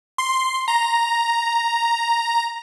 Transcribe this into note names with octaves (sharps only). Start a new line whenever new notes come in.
C6
A#5